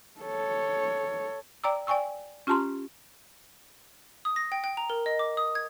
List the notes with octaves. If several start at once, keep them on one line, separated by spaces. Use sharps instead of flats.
A4 C#5
D5 G5 A#5 D6 E6
D5 G5 G#5 C#6 E6
C#4 F4 G4 A5 A#5 C6
D#6
A#6
G5
G5
A#5
A#4
D#5
D6
D#6
G#6